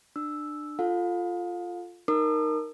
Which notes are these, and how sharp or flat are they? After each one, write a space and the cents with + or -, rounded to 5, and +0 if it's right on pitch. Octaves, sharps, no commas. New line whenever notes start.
D4 +25 E6 +0
F4 +0 A4 +0 F5 +35
D#4 -5 A#4 +0 D#6 -45